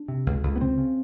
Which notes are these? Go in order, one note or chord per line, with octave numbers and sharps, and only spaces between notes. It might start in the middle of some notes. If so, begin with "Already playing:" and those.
Already playing: D4
C3
C#2
C#2
B3
C#3 C4
C#3